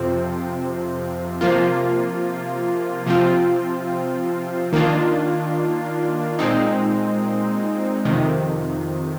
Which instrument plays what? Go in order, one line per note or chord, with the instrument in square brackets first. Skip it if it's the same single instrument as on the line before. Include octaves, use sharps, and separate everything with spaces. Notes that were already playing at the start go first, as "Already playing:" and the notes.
Already playing: [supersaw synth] F2 C3 F3 C4
C3 F3 A#3 F4
C3 F3 C4 F4
D#3 A#3 D4 F4
A#2 G#3 C4 D#4
F2 C3 D#3